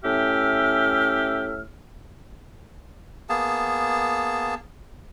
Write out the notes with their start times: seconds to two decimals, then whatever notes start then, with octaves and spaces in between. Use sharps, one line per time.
0.03 A2 C#4 G4 E5 F6
3.29 A#3 B3 G#4 A5